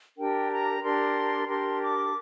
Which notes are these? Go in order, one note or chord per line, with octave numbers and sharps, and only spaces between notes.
D4 G4 A#4 G5
A#5
D4 G4 A#4 C6
D4 G4 A#4 C6
D6